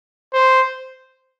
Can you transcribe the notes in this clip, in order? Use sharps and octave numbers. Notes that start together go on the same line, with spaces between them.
C5